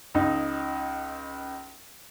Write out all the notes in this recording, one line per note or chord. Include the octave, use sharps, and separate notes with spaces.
C#2 D#4